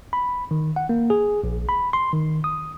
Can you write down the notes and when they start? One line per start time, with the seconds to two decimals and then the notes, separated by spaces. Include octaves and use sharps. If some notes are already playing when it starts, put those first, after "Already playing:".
0.13 B5
0.51 D#3
0.76 F#5
0.89 A#3
1.10 G#4
1.44 A#1
1.69 B5
1.93 C6
2.13 D#3
2.44 D#6